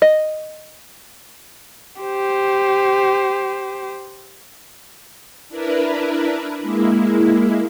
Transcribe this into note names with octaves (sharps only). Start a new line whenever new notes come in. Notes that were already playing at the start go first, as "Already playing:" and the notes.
D#5
G4 C5
D4 E4 A#4 B4
G#3 A#3 E4